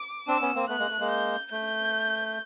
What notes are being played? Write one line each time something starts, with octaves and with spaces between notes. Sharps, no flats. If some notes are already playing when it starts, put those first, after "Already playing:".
Already playing: D6
C4 D4 E6
B3 C#4
A#3 C4
A3 B3 F#6
G#3 A#3
A3
G#3 A#3
G6
A3 G6